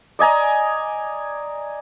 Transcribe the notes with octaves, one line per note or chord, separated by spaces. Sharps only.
D5 D#5 G#5 A#5